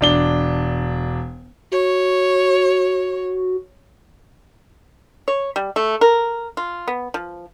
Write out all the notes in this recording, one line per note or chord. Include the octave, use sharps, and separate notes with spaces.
E1 D4 G7
F#4 C#5
C#5
G3
A3
A#4
F4
B3
F3